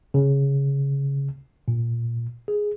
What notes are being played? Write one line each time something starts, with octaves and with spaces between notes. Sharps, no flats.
C#3
A#2
G#4